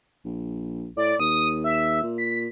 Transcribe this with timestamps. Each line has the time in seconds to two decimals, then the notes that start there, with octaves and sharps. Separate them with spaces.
0.25 A#1
0.97 A2 D5
1.20 D#2 D#6
1.64 E5
2.03 A#2
2.18 B6